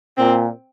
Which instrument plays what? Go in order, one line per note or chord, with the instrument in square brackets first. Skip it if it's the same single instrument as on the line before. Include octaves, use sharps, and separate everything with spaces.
[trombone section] A#2 [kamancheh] C4